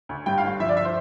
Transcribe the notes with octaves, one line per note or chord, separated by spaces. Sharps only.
D2
G2 G5
F5
G1
F3 E5
D5
E5
C5